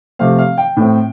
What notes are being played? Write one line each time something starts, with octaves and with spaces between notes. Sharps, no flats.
C3 F3 A3 C4 F5
F5
G5
A2 A3 C4